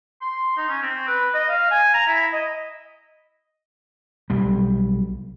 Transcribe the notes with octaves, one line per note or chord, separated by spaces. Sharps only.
C6
D#4
C#4
C4
B4
D#5
F5
G#5
A#5
E4
D#5
B1 G3